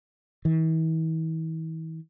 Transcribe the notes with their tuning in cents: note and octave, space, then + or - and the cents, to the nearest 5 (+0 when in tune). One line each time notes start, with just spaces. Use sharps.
E3 -40